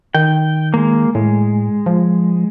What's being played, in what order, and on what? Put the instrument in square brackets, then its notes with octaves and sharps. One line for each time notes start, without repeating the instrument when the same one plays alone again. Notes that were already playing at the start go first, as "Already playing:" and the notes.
[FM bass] D#3 [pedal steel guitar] G5
[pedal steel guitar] G#3 A#3
[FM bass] A2 [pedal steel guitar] G#3
[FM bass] F3